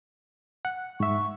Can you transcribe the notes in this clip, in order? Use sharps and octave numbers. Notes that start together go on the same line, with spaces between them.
F#5
G#2 E5 C#6